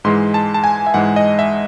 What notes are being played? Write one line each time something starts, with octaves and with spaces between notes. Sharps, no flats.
G#2 E3 G#3 C6
A5
A5
G#5
E5
G#2 E3 G#3 F#5
D#5
E5